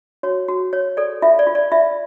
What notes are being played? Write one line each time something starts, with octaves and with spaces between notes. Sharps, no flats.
F#4 C#5
F#4
C#5
A4 D5
F4 E5
D5
F4
D5
F4 E5